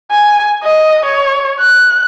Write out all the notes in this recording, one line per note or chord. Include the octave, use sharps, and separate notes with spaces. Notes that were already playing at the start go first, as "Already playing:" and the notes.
G#5
D#5
C#5
F#6